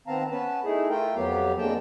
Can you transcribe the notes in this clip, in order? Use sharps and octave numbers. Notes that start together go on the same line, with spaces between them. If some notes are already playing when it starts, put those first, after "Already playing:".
D#3 B3 C4 F5 A5 A#5
B3 C#4 B4 A5
A3 D#4 E4 G#4
A3 F4 A#4 G5
F2 F#3 B3 G4 F5
F2 D3 G#3 A#3 G5 A5